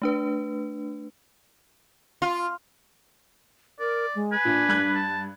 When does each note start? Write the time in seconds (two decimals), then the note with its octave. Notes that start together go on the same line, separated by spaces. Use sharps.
0.02 A3 D4 B4
2.22 F4
3.80 A#4 D5
4.15 G#3
4.32 B4 G#5
4.45 A#2 D4
4.69 G2 F#6 G#6
4.94 A5